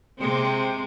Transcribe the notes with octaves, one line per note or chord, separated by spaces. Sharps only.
C3 G#3 C4